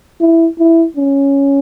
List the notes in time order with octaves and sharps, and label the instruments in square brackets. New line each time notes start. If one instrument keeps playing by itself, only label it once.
[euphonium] E4
E4
C#4